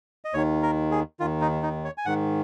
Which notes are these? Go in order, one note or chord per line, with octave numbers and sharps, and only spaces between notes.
D#5
D#2 D#3 C#5
A#4
G#4
D#2 D#3 F4
D#4
D#4
C#5
G#5
G#2 D#3 F#5